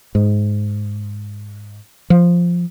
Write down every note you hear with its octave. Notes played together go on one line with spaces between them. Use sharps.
G#2
F3